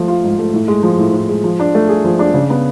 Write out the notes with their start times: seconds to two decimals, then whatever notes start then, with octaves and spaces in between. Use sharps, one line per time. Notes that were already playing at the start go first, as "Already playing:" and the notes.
Already playing: F3 A3
0.08 F4
0.24 G#2
0.39 A3
0.54 A2
0.68 G#3
0.83 F3
0.98 A2
1.13 A2
1.29 G#3
1.44 F3
1.60 D4
1.75 A3
1.89 G#4
2.04 F3
2.19 D4
2.34 C#3
2.50 B3